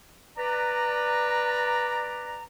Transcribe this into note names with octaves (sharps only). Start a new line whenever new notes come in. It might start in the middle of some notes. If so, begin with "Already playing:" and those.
B4 D5 A#5